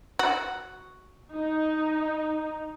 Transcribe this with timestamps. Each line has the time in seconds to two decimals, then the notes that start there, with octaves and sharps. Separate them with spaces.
0.19 F#4
1.34 D#4